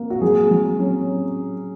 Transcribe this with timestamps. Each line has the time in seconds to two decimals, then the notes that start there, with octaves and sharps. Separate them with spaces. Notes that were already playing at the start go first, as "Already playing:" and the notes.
Already playing: A#3
0.10 F#4
0.21 F#3 G#4
0.51 F#3
0.79 C#4